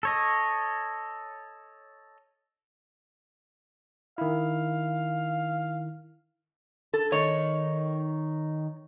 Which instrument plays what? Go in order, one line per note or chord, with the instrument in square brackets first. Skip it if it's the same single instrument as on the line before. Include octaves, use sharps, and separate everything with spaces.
[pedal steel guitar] A4 C#5 D#5
[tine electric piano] D#3 E4 [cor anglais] F5
[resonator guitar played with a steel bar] A4
[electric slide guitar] D#3 D#4 [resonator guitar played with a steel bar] C#5